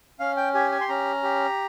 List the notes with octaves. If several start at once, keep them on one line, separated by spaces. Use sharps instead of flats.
C#4 F5
G5
G4 G#5
G#5
C6
C#4 A#5
G4